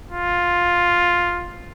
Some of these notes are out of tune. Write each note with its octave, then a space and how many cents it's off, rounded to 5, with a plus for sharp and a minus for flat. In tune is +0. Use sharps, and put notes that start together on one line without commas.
F4 +5